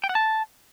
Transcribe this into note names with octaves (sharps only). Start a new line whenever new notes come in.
G5
F#5
A5